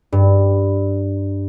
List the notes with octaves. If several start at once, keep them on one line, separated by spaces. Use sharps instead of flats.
G2